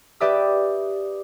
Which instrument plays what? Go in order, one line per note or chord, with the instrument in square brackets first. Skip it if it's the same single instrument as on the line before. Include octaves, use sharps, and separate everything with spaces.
[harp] G4 B4 D5 E5 D#6 E6